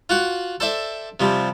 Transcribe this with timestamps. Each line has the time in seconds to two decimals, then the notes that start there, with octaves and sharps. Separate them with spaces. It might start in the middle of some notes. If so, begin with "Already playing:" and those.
0.09 F4 F#4 F#5
0.60 A4 C5 D5 E5
1.20 C3 F3 G3